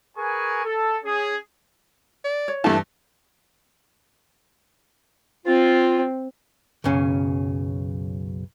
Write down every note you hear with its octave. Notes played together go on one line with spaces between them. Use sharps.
G#4 A#4 B4 G#5 C#6
A4
C#4 G#4
D5
C#5
G2 E3 A3 A5
C4 F4
B1 F#2 C#3 C#4